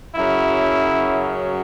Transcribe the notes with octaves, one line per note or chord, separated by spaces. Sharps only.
F#2 C#3 F#3 E4